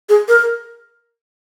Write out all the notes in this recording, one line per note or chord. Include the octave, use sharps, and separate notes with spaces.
G#4
A#4